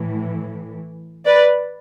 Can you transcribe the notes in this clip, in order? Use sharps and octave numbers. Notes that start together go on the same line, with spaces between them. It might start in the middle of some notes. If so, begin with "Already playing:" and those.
Already playing: A2 E3
B4 D5